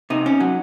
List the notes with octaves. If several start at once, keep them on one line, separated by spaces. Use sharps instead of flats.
C3 D#4
C#4
F#3